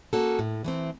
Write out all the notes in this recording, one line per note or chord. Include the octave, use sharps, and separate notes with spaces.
A#3 C#4 F#4 A4
A2
E3 A3 C4